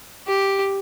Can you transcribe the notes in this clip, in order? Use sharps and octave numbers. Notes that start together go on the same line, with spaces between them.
G4